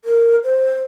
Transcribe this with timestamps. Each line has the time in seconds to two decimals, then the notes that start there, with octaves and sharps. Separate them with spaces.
0.05 A#4
0.44 C5